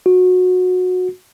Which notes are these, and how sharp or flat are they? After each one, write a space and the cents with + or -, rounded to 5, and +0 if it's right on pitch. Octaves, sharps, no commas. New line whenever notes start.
F#4 -20